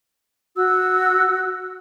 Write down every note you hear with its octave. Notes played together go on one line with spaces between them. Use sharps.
F#4 E6